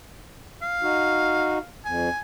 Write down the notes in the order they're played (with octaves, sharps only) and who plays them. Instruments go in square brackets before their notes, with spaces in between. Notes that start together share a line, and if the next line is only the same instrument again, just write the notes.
[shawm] F5
[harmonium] D#4 F#4
[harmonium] F2 [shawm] G#5